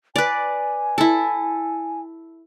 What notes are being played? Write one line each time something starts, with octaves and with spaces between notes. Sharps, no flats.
B4 D5 G#5
E4 A4